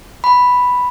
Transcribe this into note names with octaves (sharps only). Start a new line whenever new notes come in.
B5